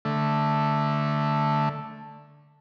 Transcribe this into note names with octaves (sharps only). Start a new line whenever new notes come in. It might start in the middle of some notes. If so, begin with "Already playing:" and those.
D3 A3